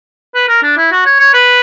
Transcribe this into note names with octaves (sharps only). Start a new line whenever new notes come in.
B4
A#4
D4
E4
F#4
C#5
C#5
B4